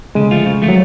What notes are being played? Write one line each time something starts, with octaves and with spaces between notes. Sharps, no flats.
C#3 G#3
F3 A3 F4
C#3
F3 A3 F4
F#3